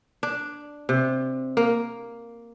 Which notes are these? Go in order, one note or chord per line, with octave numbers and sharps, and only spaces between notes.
D4
C3
A#3